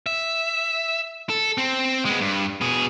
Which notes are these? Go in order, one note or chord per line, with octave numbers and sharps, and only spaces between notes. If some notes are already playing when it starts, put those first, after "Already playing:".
E5
A4
C4
G#3 B3
G2
B2 G#4